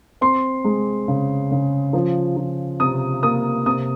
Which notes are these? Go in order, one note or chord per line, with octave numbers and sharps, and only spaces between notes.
C4 C6
G#3
C#3
C#3
F3
F3
C3 D#6
A#3 D#6
C3 D#6